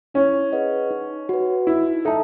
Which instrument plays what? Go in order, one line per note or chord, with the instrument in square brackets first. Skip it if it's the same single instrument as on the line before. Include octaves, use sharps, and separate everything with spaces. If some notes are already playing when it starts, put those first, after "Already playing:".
[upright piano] C#4 [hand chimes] E4
[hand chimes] G#4 B4 D#5 F#5
D#4
F#4 B4
[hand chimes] D#4 [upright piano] E4
[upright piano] D#4 [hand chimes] A4 E5 A5